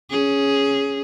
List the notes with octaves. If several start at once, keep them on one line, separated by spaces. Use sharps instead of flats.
C#4 G#4